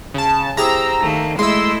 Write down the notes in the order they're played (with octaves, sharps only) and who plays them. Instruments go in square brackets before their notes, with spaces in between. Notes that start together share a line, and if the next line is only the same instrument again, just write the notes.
[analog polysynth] C#3 A5
[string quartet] C4 [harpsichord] E4 G4 G#4 [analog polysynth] A#5 E6
[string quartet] D#3 A3 A#3
[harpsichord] G#3 [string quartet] A3 E4 D#5 [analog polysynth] C6 E6